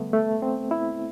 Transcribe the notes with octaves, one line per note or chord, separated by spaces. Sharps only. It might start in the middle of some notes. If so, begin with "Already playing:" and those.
Already playing: D3 G3 A3 B3
A3
C4
E4